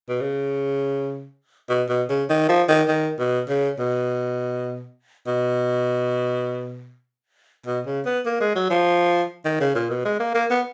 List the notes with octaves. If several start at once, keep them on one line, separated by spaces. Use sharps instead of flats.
B2
C#3
B2
B2
C#3
D#3
F3
D#3
D#3
B2
C#3
B2
B2
B2
C#3
B3
A#3
G#3
F#3
F3
D#3
C#3
A#2
B2
G#3
A#3
A#3
B3